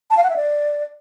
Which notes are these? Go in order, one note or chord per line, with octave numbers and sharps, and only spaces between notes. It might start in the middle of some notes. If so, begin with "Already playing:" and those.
A5
F5
F#5
E5
D5